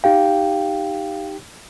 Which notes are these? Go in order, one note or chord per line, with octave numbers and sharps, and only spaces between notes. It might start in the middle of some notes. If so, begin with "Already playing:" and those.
D#4 G4 F5 G5